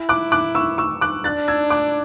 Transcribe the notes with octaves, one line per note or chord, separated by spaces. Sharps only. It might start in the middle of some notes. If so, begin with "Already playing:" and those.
Already playing: E4
D6 F#6
D6 F#6
C#6 E6
C#6 E6
D6 F#6
D4 F#6 A6
E6 G#6
D6 F#6